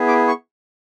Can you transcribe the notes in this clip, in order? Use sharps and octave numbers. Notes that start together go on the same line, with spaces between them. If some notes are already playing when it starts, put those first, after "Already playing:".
Already playing: B3 E4 G#4
D6
C#6